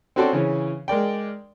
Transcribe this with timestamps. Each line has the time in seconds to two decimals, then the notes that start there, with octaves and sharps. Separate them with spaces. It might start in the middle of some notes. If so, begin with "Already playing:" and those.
0.16 C4 C#4 F#4 A4 C5 D5
0.33 C#3 E3 C#4
0.88 G#3 A#4 D5 G5